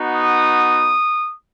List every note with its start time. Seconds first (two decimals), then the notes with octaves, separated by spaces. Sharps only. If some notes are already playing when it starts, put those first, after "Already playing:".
Already playing: B3 D#4 F#4
0.13 D#6